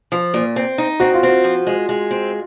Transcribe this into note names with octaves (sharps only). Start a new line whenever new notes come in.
F3
A#2
C4
D#4
C4 F#4
F4
C4 F#4
F3
G#3
G#3
C4